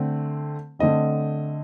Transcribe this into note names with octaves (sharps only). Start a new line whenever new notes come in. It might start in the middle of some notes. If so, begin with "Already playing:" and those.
Already playing: D3 A3 C4
D3 A3 C4 D#5